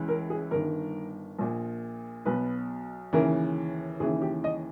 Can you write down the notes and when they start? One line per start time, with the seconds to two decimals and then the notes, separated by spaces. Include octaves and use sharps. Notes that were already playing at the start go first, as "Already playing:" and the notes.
Already playing: C#2 C#3 E3
0.08 A#4
0.30 G#4
0.51 G1 G2 D#3 A#4
1.39 A#1 A#2
2.25 B1 B2 B4
3.13 D#2 C#3 E3 A#4
4.00 D#2 C#3 E3 G#4
4.22 G4
4.44 D#5